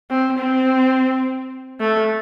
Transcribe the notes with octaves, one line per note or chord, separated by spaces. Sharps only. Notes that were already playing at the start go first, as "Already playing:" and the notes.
C4
C4
A3